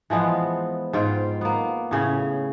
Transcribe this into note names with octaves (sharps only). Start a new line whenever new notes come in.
E3 F3 G#3 B3
G#2 F4 G5
A#3 B3
A2 C#3 C#4